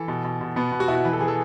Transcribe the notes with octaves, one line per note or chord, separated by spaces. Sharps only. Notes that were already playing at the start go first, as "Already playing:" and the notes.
Already playing: E3 A4
B2
B2
B2
B2 B3
B2
F#4
B2 E4
F#4
E3 B4
A4
E3 G#4
A4